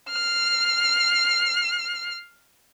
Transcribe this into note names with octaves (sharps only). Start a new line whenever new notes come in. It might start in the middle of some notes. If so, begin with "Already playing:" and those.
F6 C7